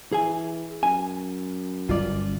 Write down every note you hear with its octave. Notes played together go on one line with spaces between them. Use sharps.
E3 G#4 G#5
F#2 G#5
G1 G3 C#4 F4 D5